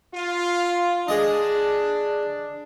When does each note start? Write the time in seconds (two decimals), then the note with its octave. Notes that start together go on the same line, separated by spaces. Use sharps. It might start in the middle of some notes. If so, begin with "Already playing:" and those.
0.15 F4
1.08 D4 G#4 D#5